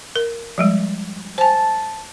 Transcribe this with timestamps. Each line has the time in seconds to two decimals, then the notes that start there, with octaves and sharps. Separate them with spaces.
0.16 A#4
0.58 F3 G3 G#3
1.38 C5 G#5 A5